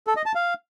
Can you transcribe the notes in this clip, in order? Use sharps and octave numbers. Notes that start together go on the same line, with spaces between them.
A4
D#5
A5
F5